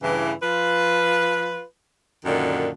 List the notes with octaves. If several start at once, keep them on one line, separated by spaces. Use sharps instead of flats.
G2 C#3 E3
F3 F4 B4
F#2 A#2 D3 D#3